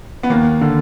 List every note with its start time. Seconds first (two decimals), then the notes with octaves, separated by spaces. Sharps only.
0.23 B3
0.30 D#2 A#3
0.61 D3